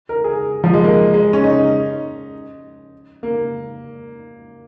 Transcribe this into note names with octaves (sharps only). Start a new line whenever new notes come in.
A#4
G#4
F3
G#3
A#3
G#3
C#4
D#4
A#3